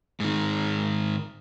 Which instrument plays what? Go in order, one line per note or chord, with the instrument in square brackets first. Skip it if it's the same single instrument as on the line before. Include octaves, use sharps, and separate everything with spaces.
[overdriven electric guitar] G#2 D#3